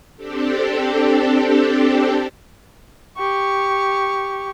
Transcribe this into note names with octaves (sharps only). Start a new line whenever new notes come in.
C4 D4 G4 A4
G4 C#6